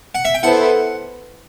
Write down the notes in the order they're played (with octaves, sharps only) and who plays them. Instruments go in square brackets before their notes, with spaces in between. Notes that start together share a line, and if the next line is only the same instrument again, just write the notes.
[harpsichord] F#5
E5
G5
[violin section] B3 E4 A4 C5 [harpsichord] F#5